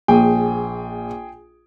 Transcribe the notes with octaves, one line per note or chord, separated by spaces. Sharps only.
A#1 G#4 G5 G#5